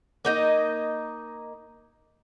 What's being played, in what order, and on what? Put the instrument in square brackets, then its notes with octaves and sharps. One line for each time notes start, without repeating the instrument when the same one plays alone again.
[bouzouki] A#3 D#4 D#5